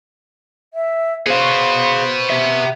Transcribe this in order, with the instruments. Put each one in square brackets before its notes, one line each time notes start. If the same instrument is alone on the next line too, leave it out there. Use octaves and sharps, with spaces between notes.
[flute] E5
[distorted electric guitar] B3 F#4 [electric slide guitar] G#4 F5 [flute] C5
[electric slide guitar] G4 E5